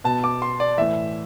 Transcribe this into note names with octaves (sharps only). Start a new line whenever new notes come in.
B2 A5
D6
C6
D5
A2 E3 E5